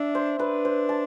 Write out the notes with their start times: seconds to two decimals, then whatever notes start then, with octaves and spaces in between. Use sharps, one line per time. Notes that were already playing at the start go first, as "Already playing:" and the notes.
Already playing: D4 E5
0.15 C5
0.39 D4 B4
0.65 C5
0.89 A5